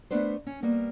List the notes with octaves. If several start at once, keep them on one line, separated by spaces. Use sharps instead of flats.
A3 B3 D4 B4 C5
C#4
G3 A#3 B3